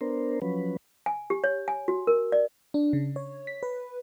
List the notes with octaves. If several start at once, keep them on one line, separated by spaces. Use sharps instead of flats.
B3 D4 A#4 C5
F3 F#3 C#4 B4
G#5
G4
C#5
G#5
F#4
A#4
D5
D4
C#3
C#5
B6
B4